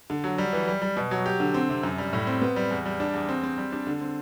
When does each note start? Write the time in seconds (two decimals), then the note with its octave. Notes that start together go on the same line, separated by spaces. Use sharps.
0.10 D3
0.24 F#3
0.38 G3
0.53 E3
0.68 G3
0.82 G3
0.97 B2
1.11 F#3
1.26 G4
1.40 D3
1.54 C4
1.69 C3
1.83 F#2
1.98 G3
2.13 A2
2.27 C4
2.41 B3
2.56 G3
2.71 E2
2.86 G3
3.00 D4
3.14 E2
3.29 C4
3.43 C4
3.58 G3
3.72 D4
3.87 D3
4.01 C4